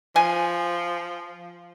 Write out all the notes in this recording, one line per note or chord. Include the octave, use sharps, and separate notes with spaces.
F3 G#5